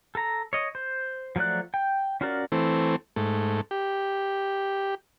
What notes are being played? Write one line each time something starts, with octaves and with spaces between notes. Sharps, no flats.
A4 A#5
C#5 D#5
C5
F3 F#3 A3 D5 F#6
G5
C#4 F4 F#4 A#4 D5
E3 A3 C4
G#2 A3
G4